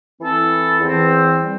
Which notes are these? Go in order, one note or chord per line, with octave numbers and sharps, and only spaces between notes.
E3 C4 E4 A4
E2 E3 C4
G3